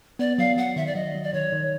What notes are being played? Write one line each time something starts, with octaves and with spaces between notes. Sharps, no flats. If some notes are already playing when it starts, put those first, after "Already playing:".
B3 D5
F#3 F5
F#3 F#5
D#3 E5
D5
F#3 D#5
F#3
D5
D#3 C#5
D#3